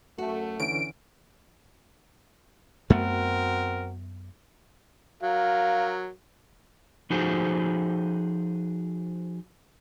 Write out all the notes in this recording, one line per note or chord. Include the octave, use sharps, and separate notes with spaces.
F#2 A3 F#4
D3 E3 C#4 D7
F#2 A3 B3 C4 F#4 A#4
F#3 A#4 F5
F3 D#4 F#4 G#4 A4 C5